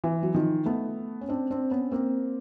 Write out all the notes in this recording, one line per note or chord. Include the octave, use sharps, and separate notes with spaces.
E3
F#3
D#3 F3
A3 B3
C#4
C4 D4
C4 D4
B3 C#4
A#3 C4